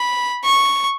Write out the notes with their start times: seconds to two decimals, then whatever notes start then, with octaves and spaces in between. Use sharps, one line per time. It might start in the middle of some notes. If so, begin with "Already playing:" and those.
Already playing: B5
0.44 C#6